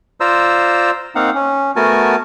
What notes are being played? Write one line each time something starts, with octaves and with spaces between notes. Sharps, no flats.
F4 C5 D5 A#5 E6
A#3 C4 D#4 F5 F#5
C#4
A3 B3 F#4 A#4 G#5 A5